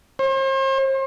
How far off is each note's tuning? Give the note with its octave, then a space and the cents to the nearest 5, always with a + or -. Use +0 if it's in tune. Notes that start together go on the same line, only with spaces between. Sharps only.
C5 +40